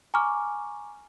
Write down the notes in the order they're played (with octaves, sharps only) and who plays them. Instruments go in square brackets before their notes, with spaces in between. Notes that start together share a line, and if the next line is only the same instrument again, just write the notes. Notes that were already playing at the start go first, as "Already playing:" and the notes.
[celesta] G#5 A#5 C#6 D6 F6